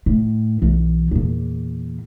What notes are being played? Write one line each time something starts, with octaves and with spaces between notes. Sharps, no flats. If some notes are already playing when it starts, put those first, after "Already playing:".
A2
B1 E3
E2 A#2